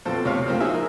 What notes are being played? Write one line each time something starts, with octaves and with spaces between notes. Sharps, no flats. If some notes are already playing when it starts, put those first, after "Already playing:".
B2 F3 C4 A4
D2 C3 C#5 F5
G#2 F3 A#3 C4 F6
D#4 F#4 G#4 E5
A#4